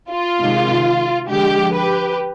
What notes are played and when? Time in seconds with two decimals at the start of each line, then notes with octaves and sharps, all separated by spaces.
0.10 F4
0.40 C3 D#3 G#3
1.29 D3 F3 G#3 G4
1.73 G4 B4